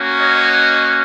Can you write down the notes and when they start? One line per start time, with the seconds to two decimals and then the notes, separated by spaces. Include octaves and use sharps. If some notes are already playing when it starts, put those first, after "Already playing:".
Already playing: A#3 C#4 F#4
0.20 C#5 D#5